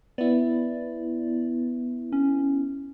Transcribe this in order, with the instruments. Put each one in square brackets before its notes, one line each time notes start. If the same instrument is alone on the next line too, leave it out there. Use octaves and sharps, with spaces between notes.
[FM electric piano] B3 E4 [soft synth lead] D5
[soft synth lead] C#4